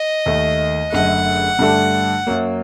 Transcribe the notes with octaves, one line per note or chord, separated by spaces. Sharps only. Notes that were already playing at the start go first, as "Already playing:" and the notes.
Already playing: D#5
D#2 D#3 A3
F#1 F#2 D3 A3 F#5
G2 D3 A3 D4 A4
F#2 F#3 A#3